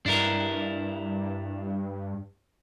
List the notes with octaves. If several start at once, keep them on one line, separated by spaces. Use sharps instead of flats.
G2 D4 E4 A#4